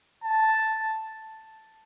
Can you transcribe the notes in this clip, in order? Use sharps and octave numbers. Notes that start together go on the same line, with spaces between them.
A5